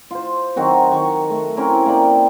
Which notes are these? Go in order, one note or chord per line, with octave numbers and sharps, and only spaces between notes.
F4 C5
D#3 F#3 C4 F#4
D#3 C#6 D6
A3
C4 C#4 E4 A#4
A#3 D5 G5